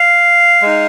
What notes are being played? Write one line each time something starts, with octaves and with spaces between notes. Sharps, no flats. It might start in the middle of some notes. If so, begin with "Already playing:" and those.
Already playing: F5
G#3 D#4